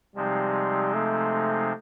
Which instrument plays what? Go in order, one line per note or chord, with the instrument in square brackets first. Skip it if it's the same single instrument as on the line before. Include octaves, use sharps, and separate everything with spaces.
[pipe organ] C3 F3 G#3 C4 D#4 [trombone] G3
[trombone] A3